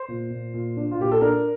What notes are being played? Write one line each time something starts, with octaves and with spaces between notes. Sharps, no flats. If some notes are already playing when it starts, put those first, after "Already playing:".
Already playing: C5
A#2
A#2
A#2
D4
F4
A#2 G4
A4
D4 A#4